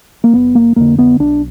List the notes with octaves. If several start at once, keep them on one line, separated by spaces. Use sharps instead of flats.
A#3
F#1 B3
A#3
F2 D3 A#3
B3
B1 D4